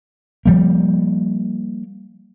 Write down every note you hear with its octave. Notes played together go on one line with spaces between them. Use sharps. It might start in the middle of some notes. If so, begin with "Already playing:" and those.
F3 G3 A#3